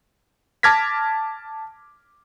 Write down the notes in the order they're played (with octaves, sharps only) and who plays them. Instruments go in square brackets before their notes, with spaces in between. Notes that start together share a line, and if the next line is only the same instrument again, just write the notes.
[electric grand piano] A5 D6 F6 G#6 A#6 B6